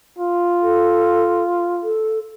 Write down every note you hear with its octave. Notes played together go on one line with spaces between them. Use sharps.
F4
A4
A4